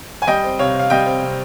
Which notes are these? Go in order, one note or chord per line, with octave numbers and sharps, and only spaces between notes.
G#5
G3 D#5 G5
C4
C3 C#5 F5
C3 F5
G3 D#5 G5
C4
C3